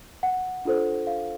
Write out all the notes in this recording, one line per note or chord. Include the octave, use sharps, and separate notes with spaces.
F#5
D4 F4 A4 C5
F5